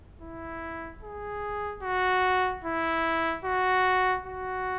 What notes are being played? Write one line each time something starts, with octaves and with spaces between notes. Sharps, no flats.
E4
G#4
F#4
E4
F#4
F#4